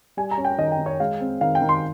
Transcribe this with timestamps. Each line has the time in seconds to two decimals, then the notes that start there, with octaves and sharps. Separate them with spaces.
0.17 G3 G#5
0.31 A#5
0.38 C#4
0.45 G5
0.58 D#3 D#5
0.72 G5
0.79 D#3
0.86 C#5
1.00 G#3 F5
1.21 C4
1.41 D#3 F5
1.55 G5
1.62 D#3
1.69 C6